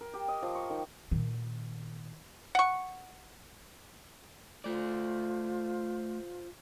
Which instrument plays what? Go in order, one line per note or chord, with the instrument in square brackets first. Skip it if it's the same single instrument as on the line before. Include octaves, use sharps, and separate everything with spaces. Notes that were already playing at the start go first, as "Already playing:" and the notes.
[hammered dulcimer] A#4
G4
D#5
F3
C#6
D#3
[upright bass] A#2 D#3
[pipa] F#5 C#6
[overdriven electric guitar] A3 D5 [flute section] F4 C5